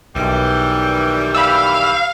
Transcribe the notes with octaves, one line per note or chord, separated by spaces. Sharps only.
B1 D#3 E3 G3
F5 B5 E6